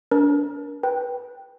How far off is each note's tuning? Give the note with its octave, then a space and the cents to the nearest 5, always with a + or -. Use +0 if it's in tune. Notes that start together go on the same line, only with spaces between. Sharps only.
D4 -30 A#4 +30
B4 -15 G5 -5